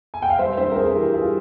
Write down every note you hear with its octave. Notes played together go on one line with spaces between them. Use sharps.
G#5
G5
F5
G3 C5 E5
G2 C5 E5
A#4
G2 G#4 C5
E3 G4 A#4
G3 F4 G#4